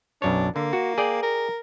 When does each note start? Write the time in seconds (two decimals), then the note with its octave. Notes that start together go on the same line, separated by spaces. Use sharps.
0.22 B1 F#2 D4 C#5
0.56 D3 A#3
0.73 F#4
0.98 G#4 D5 G5
1.23 A#4